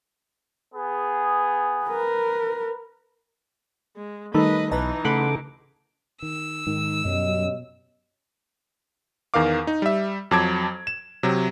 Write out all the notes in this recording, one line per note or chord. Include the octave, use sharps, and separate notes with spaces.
B3 G#4
A#4 B4
G#3
D#3 G3 A3 D#4 A4 B4 D#5 B5
B1 E3 D#4 B4 D#5 A5 A#5
C#3 A3 A4 F#5 B5 C6 D6
D#3 E6
G#2 D#3
F#2 B2 G3 C#5 D#5
E2 D#3 A#4 F5 D6
D#4
G3 E5
F2 F#3 A5 D6 G#6 D7
E7
C3 F#3